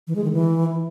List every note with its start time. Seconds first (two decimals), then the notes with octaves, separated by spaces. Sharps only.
0.07 E3
0.16 G#3
0.24 D#3
0.32 E3